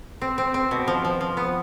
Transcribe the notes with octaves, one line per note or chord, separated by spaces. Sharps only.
C4
C4
C4
B2
F3
F3
F3
B3